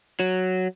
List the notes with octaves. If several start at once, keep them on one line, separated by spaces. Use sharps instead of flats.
F#3